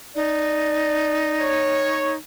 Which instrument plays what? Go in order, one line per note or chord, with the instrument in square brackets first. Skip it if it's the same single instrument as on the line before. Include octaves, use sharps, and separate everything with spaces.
[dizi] D#4 [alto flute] D5
[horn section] C#5